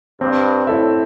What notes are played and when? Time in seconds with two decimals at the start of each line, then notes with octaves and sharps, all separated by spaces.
0.20 G2 C4
0.67 A2 E4 A4 E5